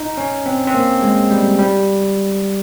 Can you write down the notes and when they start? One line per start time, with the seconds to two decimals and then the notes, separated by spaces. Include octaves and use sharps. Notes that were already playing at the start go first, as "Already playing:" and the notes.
Already playing: D#4
0.18 C#4
0.46 C4
0.67 C4
0.74 A#3
1.02 G#3
1.31 G3
1.59 G3